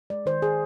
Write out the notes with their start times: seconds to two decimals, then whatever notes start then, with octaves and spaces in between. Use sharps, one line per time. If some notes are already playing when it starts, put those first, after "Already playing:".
0.10 G#3 D5
0.26 D#3 C5
0.42 D#3 G#4